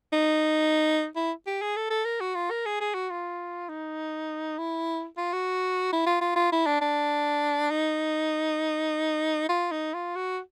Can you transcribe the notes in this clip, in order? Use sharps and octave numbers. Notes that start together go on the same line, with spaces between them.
D#4
E4
G4
G#4
A4
A4
A#4
F#4
F4
A#4
G#4
G#4
F#4
F4
D#4
E4
F4
F#4
E4
F4
F4
F4
E4
D4
D4
D#4
F4
D#4
F4
F#4